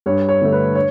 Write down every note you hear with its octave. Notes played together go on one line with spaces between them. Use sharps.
G2 C#5
C#5
D3 A3
B4
C#5